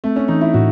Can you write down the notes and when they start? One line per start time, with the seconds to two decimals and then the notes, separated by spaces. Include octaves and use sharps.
0.04 A3 C4
0.16 C#4
0.28 E3 D#4
0.41 E4
0.54 A2 F#4